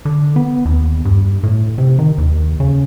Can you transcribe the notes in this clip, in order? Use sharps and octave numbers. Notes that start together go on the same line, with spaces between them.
D3
B3
D#2
G2
A2
C3
D#3
D#2
C#3